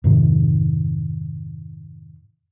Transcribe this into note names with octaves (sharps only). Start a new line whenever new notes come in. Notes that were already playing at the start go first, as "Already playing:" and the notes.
F2 G#2 C3 D#3